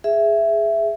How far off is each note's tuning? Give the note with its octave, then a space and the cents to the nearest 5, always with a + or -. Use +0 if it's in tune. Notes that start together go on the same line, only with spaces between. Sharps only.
G#4 +0 E5 +10